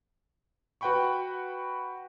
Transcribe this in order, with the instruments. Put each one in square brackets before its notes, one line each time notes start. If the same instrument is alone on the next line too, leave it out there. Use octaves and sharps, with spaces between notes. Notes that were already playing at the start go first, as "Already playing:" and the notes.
[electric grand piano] F#4 B4 F#5 G5 B5 C#6